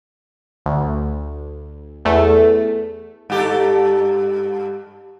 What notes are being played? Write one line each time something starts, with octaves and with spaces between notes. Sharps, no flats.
D2
E2 A3
G2 G4 A4